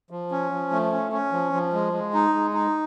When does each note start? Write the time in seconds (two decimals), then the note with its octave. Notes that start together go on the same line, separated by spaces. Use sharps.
0.10 F3
0.31 C#4
0.51 F3
0.71 A3
0.92 C#4
1.12 C#4
1.32 F3
1.53 F3
1.73 G#3
1.93 G#3
2.14 D#4
2.34 G#3
2.53 D#4